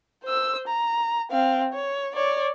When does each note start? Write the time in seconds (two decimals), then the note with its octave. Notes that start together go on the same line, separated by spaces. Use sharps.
0.24 C5 E6
0.68 A#5
1.31 C4 F5
1.73 C#5
2.15 C#5 D5